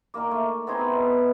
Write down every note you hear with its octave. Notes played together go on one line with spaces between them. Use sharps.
A#2 D#3 A#3 D6
A3
B3 C4 D#4 G#4
E5
B2